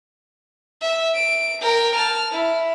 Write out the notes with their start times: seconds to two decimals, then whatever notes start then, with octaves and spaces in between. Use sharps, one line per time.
0.81 E5
1.15 D7
1.62 A#4 G5
1.96 A5 F6
2.32 E4